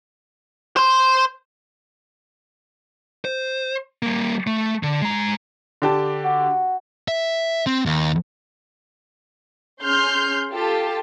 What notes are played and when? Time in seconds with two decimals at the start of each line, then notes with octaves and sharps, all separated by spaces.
0.76 C5 C6
3.25 C5
4.03 G3 A#3
4.47 A3
4.83 D3
5.02 G#3 A#5
5.82 D3 G4 A5
6.24 F#4
7.08 E5
7.67 C4
7.86 D#2
9.82 C#4 G#4 C6 F6 G6
10.52 F4 G4 A4 A5